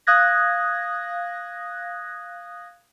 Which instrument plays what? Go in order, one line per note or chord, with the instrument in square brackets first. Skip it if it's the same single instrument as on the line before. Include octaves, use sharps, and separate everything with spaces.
[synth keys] F5 D#6 F#6 G#6 A#6